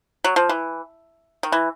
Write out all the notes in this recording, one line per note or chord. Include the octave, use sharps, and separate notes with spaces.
F#3
F3
E3
D#3
E3